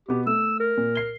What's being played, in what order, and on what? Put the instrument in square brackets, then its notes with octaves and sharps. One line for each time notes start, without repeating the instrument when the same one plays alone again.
[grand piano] B2 B3 [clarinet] G4
[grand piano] A3 [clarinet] E6
[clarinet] A#4
[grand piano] A#2
C7 G7